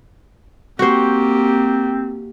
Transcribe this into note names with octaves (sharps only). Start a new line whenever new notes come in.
A#3 C4 F#4 G4 C5